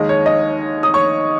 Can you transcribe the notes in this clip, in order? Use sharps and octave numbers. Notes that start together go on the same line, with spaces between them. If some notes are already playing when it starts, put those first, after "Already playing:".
Already playing: D#2 D#3 G#3 D#5
C#5
D#5
D#6
C#5 C#6